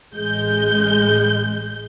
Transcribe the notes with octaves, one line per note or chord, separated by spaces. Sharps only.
A1 G#3 G6